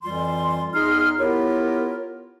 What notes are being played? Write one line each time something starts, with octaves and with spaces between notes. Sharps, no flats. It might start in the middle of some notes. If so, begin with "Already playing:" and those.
F2 E3 G3 F4 C6
E2 D#4 G#4 C6 F6
B3 E4 F4 G4 A#4 C#5